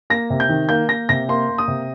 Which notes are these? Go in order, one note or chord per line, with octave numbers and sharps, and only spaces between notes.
A#3 A#6
C3
G6
D#3
A#3 G6
A#3 A#6
C3 A#6
A#3 C6
A#3
D#6
C3